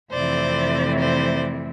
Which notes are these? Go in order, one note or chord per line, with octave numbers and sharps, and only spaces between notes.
F2 C3 E3 A3 C5 D5
C5 D5